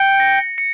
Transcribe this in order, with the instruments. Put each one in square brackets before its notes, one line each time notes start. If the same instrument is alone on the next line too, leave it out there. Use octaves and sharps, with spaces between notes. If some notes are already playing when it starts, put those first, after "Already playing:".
Already playing: [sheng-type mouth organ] G5 [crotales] C#7
[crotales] A#6
C#7